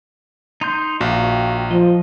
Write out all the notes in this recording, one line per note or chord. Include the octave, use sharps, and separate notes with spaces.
D#4 C6 G6
A#1 F#4 F5 G5
F3 D#5